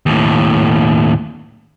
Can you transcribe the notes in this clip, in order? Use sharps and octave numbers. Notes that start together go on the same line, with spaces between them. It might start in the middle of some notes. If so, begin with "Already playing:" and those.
D#2 A2